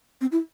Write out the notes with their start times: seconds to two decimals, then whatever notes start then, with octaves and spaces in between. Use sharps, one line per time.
0.21 C4
0.32 E4